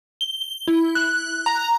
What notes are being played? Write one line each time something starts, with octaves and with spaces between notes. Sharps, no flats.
G7
E4
F#6
A#5